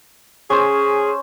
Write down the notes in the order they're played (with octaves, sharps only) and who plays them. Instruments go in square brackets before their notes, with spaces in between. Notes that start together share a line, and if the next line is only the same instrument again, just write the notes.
[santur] C#4 C5 [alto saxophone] G#4